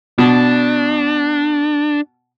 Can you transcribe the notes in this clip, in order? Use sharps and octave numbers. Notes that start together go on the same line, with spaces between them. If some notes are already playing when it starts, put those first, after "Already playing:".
B2 D4